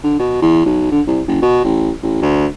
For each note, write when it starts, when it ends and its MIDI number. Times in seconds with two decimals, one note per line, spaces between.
0.04 0.16 50
0.19 0.39 47
0.42 0.62 40
0.66 0.88 35
0.92 1.01 50
1.07 1.21 36
1.28 1.40 30
1.42 1.61 47
1.65 1.91 33
2.03 2.19 33
2.22 2.47 38